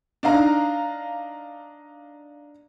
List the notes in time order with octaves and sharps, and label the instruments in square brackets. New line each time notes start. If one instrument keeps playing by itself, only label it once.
[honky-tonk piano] D4 D#4 F5 A#5